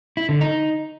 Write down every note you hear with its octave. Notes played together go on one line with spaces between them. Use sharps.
E4
D3
D#4